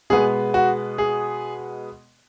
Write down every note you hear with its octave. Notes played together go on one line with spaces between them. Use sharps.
B2 G#3 B3 G#4
F#4
G#4